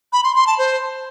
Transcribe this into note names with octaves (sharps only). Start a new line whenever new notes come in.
B5
C6
C6
A5
C5